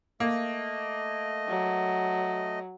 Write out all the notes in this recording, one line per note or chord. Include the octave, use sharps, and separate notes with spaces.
A3 A#3 D#5
F#3